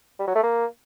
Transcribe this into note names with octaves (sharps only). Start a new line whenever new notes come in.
G3
F#3
A3
A#3